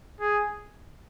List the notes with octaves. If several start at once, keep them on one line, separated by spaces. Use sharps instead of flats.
G#4